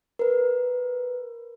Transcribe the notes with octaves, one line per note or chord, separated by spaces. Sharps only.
A#4 B4